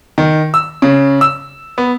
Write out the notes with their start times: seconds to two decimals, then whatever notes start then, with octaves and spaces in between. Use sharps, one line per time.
0.18 D#3
0.54 E6
0.82 C#3
1.21 E6
1.78 B3